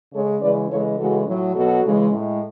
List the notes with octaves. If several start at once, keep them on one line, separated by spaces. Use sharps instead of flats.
C#3 G#3 A4 C#5
C#3 E3 G#3 B4 D5
C#3 E3 G#3 A4 C#5
C#3 E3 G#3 F#4 A4
A2 F#3
B2 F#3 F#4 A4
C#3 E3 G#3
A2 G#3